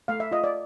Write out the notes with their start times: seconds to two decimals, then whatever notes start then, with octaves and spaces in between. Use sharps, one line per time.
0.08 A3 F5
0.20 E5
0.32 F4 D#5
0.44 D5